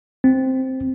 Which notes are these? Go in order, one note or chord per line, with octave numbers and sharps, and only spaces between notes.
C4